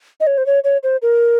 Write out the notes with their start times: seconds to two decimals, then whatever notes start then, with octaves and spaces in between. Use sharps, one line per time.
0.20 D#5
0.27 C#5
0.38 C5
0.46 C#5
0.64 C#5
0.83 C5
1.02 A#4